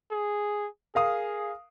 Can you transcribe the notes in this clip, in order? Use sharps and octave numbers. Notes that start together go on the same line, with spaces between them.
G#4
G#4 A#4 F5 D#6